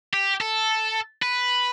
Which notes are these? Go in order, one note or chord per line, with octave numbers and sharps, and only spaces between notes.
G4
A4
B4